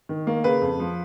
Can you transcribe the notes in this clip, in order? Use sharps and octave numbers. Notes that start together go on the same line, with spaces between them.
D#3
A#3
C#3 B4
F2
F3